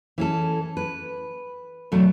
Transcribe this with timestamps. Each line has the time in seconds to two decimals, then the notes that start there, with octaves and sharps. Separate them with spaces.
0.18 E3 C#4 A4
0.77 B4
1.92 E2 B2 F#3 A3